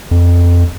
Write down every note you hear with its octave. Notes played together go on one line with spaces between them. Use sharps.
F2